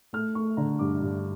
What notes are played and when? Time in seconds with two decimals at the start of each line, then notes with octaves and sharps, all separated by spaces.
0.13 A3 F6
0.35 A3 C#6
0.57 D3 A#5
0.79 G2 D6
1.02 G2